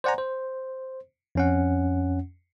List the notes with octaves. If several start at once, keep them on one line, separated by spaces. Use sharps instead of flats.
C5 D5 F#5 G#5 A#5
C5
F2 C#4 F#5